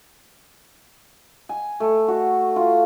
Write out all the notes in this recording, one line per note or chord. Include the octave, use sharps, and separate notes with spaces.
G#5
A3
F#4
F4